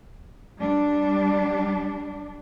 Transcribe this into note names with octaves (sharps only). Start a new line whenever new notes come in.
G3 D4